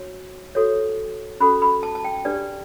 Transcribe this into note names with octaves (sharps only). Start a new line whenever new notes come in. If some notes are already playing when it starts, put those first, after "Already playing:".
Already playing: F#4 C#5
F#4 A4 C#5
C#4 F#4 A4 B5
B5
A5
A5
G5
D4 G4 B4 D5